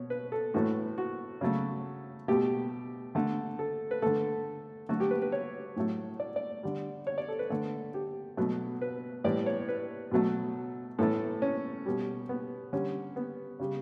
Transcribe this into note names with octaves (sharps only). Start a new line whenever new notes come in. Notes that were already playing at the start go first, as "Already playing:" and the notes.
Already playing: B2 C#5
B4
A4
A2 E3 A3 F#4
F#4
C#3 F#3 A3
B2 A3 G4
D3 A3
A4
B4
D3 A3 A4
D3 F#3 A3 F#4
G4
B4
B4
C#5
A2 F#3 A3
D5
D5
D3 G3
C#5
D5
A4
B4
D3 A3 A4
G4
B2 F#3 A3
B4
A2 E3 G3 D5
C#5
B4
B2 F#3 A3
A2 E3 A3 A4
C#4
B2 G3
B3
D3 G3 C#4
B3
C#3 G3